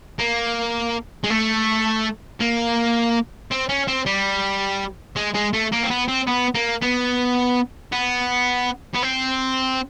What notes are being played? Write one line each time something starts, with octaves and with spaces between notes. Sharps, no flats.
A#3
G#3
A3
A#3
C4
C#4
C4
G3
G#3
G#3
A3
A#3
C4
B3
C4
B3
A#3
B3
B3
B3
C4